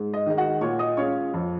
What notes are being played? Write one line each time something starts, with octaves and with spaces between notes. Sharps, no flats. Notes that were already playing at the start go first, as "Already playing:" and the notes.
Already playing: G#2
D#5
D#3 G#3 D#4
F#4 F#5
A#2 C#5 C#6
D#5 D#6
G#3 C#4 F4 C#5 C#6
F2